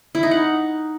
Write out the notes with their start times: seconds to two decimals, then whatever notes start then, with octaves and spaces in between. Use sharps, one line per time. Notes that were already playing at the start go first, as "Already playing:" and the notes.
0.15 E4
0.23 D#4
0.31 F#5